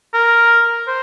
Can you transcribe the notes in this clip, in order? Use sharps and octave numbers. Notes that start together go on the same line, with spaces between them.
A#4
C5